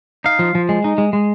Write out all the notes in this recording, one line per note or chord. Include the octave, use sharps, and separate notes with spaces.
D#4 F5
F3
F3
G#3
D#4
G#3
G#3